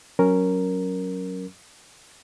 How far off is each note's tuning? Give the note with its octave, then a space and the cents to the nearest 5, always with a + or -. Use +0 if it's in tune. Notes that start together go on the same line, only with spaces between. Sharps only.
F#3 +0 C#4 +0 A#4 +0